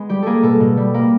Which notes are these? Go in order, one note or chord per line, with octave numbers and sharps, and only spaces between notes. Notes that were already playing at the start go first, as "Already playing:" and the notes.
Already playing: G#3 B3
G3 G4
A#3 G#4 A4
B2 A4
B2
G3
A#3